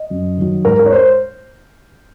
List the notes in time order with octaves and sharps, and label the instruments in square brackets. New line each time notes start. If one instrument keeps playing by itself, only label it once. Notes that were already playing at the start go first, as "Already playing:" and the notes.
Already playing: [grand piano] D#5
F#2
D#3 F#3
G#2 A#4
A#4
C#5
C5